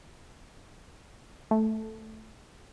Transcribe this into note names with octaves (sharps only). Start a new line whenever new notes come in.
A3